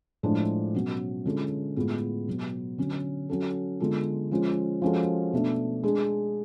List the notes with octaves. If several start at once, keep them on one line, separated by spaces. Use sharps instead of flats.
A2 F3 G#3 D4 G#4
B2 F#3 C#4 F#4
D3 G#3 C#4 F4 A4
A2 G#3 B3 F4 G#4
B2 F#3 B3
D3 F#3 C#4
F#3 C#4 F#4 A4
D3 G#3 B3 F4 A4
F3 G#3 C#4 F4
F3 G#3 C#4 F#4 A4
B2 A3 D4
G#3 D4 G#4